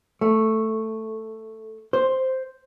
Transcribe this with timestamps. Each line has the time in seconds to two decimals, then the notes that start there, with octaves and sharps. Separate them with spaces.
0.21 A3
1.93 C5